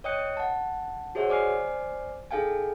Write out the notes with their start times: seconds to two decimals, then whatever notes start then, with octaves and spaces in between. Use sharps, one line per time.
0.04 C#5 D#5 G5 D#6 F#6 C#7
0.37 F#5 A5
1.15 F#4 G#4 C5 C#5 E5 F#5
1.29 C5 D5 G#5 D6 F6 C7
2.31 D#4 G#4 A4 F5 G5 G#5